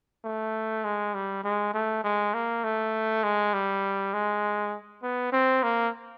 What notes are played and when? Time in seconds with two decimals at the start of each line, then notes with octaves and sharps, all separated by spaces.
0.25 A3
0.85 G#3
1.14 G3
1.44 G#3
1.74 A3
2.04 G#3
2.34 A#3
2.64 A3
3.24 G#3
3.54 G3
4.14 G#3
5.03 B3
5.33 C4
5.63 A#3